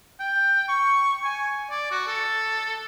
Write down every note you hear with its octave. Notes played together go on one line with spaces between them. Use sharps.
G5
C#6
G#5
D5
F#4
A4